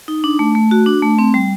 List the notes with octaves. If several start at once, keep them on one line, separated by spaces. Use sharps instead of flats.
D#4
D4
A3
A3
F#4
D4
A3
C4
G3